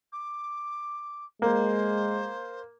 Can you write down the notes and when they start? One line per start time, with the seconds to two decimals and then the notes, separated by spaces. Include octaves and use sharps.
0.12 D6
1.42 G#3 A#3 C5